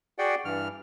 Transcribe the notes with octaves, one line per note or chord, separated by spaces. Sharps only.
F#4 G#4 D5 F#5 G5
G2 E3 F6